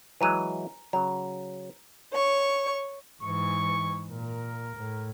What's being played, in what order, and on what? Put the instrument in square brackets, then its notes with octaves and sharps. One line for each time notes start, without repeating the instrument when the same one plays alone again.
[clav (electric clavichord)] E3 F#3 G#3 [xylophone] G#5 A#5 D#7
[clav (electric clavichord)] C#3 F#3 [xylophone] A#5
[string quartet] C#5 C#6
[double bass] G#2 E3 [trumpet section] C#6
[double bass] A#2 [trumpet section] A#4
[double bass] A2